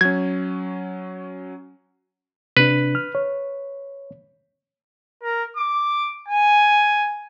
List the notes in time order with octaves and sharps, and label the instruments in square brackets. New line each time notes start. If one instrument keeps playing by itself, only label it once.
[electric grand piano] F#3 C#4 [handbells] G#6
[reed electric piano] C3 D4 [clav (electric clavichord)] B4
[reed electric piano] F6
C#5
[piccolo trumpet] A#4
D6
G#5